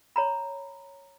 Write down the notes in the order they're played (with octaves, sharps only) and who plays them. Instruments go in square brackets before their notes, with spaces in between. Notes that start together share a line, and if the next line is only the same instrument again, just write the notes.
[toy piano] C#5 A#5 B5